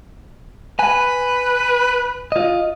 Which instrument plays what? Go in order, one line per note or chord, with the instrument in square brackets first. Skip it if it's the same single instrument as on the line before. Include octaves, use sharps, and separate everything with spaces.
[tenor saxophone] B4 [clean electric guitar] G#5
[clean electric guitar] F4 D#5